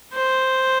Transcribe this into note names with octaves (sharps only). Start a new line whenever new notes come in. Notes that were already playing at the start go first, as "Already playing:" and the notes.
C5